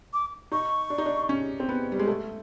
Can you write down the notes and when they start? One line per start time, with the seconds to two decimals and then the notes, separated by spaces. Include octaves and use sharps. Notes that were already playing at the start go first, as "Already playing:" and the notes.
0.13 D6
0.52 D#4 C#6
0.90 D4
0.98 D#4
1.06 D4
1.29 C#4
1.60 C4
1.69 B3
1.92 G3
1.99 G#3
2.07 A3